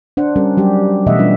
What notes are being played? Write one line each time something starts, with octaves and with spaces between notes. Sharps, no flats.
D4 C5 F#5
G3 C#4 A#4
F#3 G3 G4
B2 E3 A3 D#5 E5 F#5
G3 C#4 D4 F4 B4